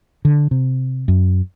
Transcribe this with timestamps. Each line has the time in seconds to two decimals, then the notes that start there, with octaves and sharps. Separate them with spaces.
0.25 D3
0.51 C3
1.08 F#2